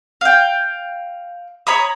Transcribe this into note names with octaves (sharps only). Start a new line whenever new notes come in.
F5 G5
C#5 A#5 B5 D#6